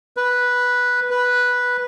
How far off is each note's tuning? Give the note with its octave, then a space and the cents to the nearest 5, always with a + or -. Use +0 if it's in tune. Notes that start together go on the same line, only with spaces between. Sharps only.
B4 -5
B4 -5